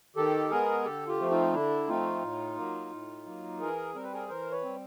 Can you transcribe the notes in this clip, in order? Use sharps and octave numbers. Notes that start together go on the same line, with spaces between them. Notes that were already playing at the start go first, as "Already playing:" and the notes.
D#3 G4 A4
G#3 B3 G#4 A#4
D3 G4 A4
F4 G4
F3 A3 C4
D#4 F4
D3 D4 E4
F3 A3 C4 D#4 F4
A2
F#3 A#3
A2
F#3 A#3
E3 G#4 A#4
G3 C4 A#4
B4
G#4 A#4
E3 A#4 C5
B4 C#5
G3 C4